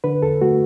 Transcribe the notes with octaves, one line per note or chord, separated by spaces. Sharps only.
D3 B4
E2 A4
A3 F#4